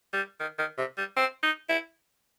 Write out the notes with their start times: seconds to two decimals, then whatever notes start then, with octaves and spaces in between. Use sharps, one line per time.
0.13 G3
0.40 D#3
0.58 D#3
0.78 C3
0.98 G3
1.17 C4
1.43 D#4
1.69 E4